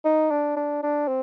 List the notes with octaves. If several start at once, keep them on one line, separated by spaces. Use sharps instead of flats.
D#4
D4
D4
D4
C4